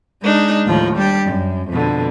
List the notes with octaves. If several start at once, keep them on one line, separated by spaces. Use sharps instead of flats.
G#3 D4 D#4
D#2 A2 F3 A#5
G3 D4 G4
F#2
F2 B2 D3